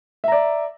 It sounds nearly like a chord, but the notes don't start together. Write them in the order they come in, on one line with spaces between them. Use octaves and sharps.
E5 A#5 D5